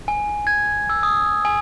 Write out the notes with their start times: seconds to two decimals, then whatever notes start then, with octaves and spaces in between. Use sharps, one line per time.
0.08 G#5
0.47 G#6
0.90 E6
1.03 D#6
1.45 G#5